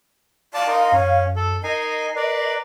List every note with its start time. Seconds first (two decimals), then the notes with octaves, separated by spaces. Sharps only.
0.54 D5 F5 A5
0.67 D#4 A#4 C6
0.92 F#2 C#4
1.36 A4
1.63 D#4 A#4 D#5 G#5 C7
2.16 A#4 B4 D5